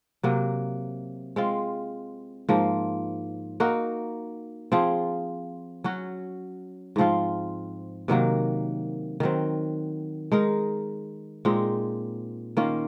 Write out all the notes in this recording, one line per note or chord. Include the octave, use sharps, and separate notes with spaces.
C3 F#3 A#3
G#3 C4 F4
G#2 F3 A#3
A#3 D#4 F#4 A#4
F3 C4 F4 G#4
F#3 C#4 F#4
G#2 F3 C4 F4
C3 D#3 F#3 A#3
D#3 F#3 C4
G#3 D#4 A#4
A#2 G#3 C4 D#4
D#3 A#3 C#4 F4